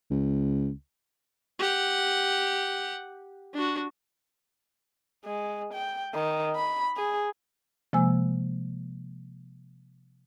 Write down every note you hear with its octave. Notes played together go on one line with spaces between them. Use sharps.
C#2
G4 F#5
D4 F#4
G#3
G5
D#3
B5
G#4
C3 F3 G#3 A#3 G#5 E6